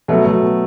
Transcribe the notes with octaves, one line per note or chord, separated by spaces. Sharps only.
B2 F#3 A3
B2 F#3 A3
B2